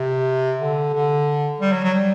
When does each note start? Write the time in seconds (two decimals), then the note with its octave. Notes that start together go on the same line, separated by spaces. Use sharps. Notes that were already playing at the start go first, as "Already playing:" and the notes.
Already playing: C3
0.60 D3
0.94 D3
1.60 G3
1.72 F#3
1.84 F#3
1.94 G3